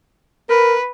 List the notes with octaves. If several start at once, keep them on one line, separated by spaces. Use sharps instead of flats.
A#4 B4